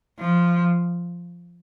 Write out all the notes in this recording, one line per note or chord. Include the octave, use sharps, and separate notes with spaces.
F3